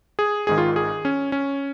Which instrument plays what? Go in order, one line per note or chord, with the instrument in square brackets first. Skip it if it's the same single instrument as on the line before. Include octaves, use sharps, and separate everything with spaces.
[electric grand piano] G#4
G#1 G#2 D#3 G#4
F4
G#4
C#4
C#4